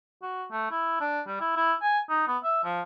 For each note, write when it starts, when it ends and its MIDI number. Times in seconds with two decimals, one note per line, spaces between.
0.22 0.44 66
0.51 0.69 57
0.71 0.96 64
1.00 1.21 62
1.27 1.40 55
1.40 1.55 64
1.57 1.73 64
1.82 1.99 80
2.09 2.25 63
2.28 2.38 59
2.43 2.60 76
2.64 2.82 53